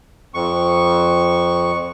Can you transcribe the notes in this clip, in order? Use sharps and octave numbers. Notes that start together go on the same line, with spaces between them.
F2 C#6